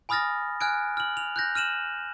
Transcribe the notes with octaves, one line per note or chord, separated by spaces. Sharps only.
G#5 B5 D#6 F6 A6 A#6
G#5 F6 F#6 G#6 D7
F6 F#7
F7
F#6 G6 A#6
F6 D#7 E7 F#7